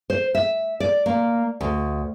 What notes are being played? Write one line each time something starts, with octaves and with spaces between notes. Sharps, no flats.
C5
E5
D5
A#3
D2